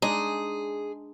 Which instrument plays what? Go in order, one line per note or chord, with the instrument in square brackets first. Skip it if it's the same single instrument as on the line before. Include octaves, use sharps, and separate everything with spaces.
[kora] G#3 D4 D#4 [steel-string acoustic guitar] G#4